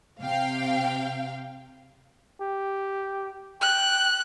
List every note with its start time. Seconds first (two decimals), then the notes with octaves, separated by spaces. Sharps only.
0.21 C3 F5 G5
2.40 G4
3.61 G5 F#6